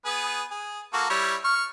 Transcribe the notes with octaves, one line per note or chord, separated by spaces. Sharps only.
B3 G#4 B4
G#4
A#3 F#4 A4
G3 E4 C#5
C#6 F6